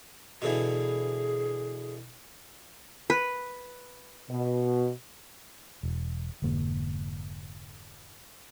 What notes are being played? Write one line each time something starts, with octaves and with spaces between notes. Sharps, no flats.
B2 D3 E3 G#4
B4
B2
E1
F1 G#2 D3 A#3